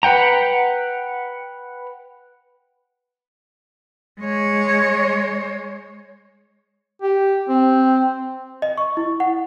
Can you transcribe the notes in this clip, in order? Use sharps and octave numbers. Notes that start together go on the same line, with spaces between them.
B4 F#5 G5 A#5
G#3 C#5
G4
C4
D#5
C#6
E4
F#5